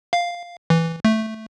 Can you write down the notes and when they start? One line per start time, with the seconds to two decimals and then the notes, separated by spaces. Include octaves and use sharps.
0.13 F5
0.70 E3
1.05 A3